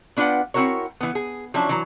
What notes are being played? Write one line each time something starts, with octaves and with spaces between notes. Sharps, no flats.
B3 D4 F4 B4 F#5 G5
C4 E4 F#4 A#4 C#5
E3 B3
G#4
F3 F#3 C#4 D4 E4
E3 F#3 A#5